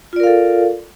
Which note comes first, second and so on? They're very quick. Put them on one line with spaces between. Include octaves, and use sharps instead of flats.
F4 D5 A#4 F5 A4